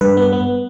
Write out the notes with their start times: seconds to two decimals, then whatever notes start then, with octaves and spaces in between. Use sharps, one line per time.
0.01 G2 B4
0.17 B3
0.33 B3